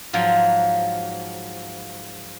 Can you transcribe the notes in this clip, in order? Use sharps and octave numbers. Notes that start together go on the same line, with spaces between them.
G#2 F3 F#3